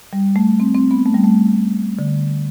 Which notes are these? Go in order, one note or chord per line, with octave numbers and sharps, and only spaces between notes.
G3
A3
C4
C4
B3
A3
G3
A3
D3